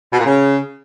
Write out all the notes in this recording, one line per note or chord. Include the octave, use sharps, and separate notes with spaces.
B2
A#2
C#3